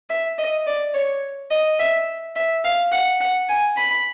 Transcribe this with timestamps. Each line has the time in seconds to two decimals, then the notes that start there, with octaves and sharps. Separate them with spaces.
0.10 E5
0.38 D#5
0.67 D5
0.94 C#5
1.51 D#5
1.79 E5
2.36 E5
2.64 F5
2.92 F#5
3.20 F#5
3.49 G#5
3.78 B5